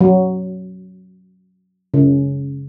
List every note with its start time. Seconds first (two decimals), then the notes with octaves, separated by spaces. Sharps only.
0.01 F#3
1.94 C#3